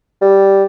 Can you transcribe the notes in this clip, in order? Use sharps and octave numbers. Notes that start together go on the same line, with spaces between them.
G3